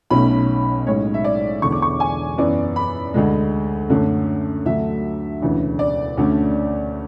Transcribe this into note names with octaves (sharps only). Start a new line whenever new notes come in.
B1 B2 A3 C#4 B5
B1 A2 G#3 C#4 C#5
E5
D5
E1 E2 D3 C#6
D6
C#6
G#5
F#2 E3 B3 D5
B5
D2 D3 G#3
F#2 D3 A3 C#4
D2 D3 F#3 A3 E5
E1 D2 C#3 E3
D5
D2 D3 A3 C#4